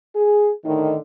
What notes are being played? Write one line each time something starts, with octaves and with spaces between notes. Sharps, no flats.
G#4
A2 D3 D#3